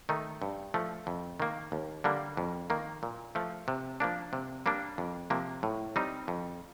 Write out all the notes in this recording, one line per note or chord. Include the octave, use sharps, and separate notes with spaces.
D#3 A3 D#4
G2
F3 A3
F2
D#3 A#3
D#2
D3 G3 A#3
F2
D#3 A#3
A#2
F3 A3
C3
F3 A#3 D4
C3
G3 A#3 D4
F2
C3 F3 A#3
A2
G3 C4 D#4
F2